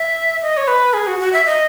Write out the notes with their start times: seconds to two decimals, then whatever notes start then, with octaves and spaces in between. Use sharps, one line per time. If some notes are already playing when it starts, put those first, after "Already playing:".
Already playing: E5
0.42 D#5
0.57 C#5
0.68 B4
0.94 G#4
1.07 F#4
1.19 F#4
1.33 E5
1.46 D#5